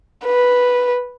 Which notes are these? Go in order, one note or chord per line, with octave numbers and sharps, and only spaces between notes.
B4